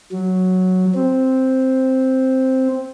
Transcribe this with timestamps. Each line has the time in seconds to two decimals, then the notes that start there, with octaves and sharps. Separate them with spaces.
0.12 F#3
0.95 C4